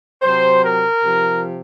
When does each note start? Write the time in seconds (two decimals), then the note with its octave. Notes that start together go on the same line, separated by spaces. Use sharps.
0.22 C3 F#3 C5
0.63 A#4
1.01 C3 F3